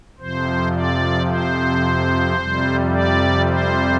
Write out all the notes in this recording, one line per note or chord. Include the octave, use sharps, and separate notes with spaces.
F2 C3 F3 C5
D5
C5
F2 C3 G3
D5
C5